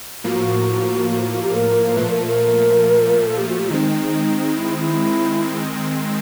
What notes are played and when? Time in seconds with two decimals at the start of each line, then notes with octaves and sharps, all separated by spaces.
0.24 A2 F3 A#3 F#4
1.10 F#4
1.21 F#4
1.32 F#4
1.42 G4
1.54 A#4
1.97 A#2 F3 A3 B4
2.11 A#4
2.26 A#4
3.27 A4
3.38 G4
3.48 F#4
3.59 G4
3.70 D#3 G#3 C4 D#4
4.56 E4
4.79 E4